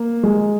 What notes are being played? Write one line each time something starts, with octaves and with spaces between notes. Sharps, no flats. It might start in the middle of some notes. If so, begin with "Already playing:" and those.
Already playing: A#3
G#3